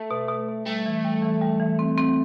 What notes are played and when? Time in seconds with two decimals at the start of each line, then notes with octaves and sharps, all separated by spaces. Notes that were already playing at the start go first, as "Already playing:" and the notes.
Already playing: A3
0.11 B2
0.29 B2
0.48 B2
0.66 G3 A3
0.86 E3
1.05 G3
1.22 E3
1.41 G3
1.60 E3
1.79 C4
1.98 C4